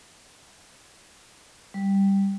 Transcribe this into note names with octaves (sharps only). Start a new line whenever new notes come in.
G3